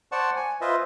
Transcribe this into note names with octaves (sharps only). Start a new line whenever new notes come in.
C5 D5 F#5 A5 C#6
G#5
F4 B4 C5 D#5 E5